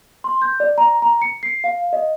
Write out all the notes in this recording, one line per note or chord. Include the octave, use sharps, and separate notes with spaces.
C6
G6
D5
A#5
A#5
C#7
C7
F5
D#5